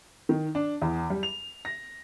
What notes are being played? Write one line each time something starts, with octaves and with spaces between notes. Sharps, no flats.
D#3
D4
E2
G3
F7
A#6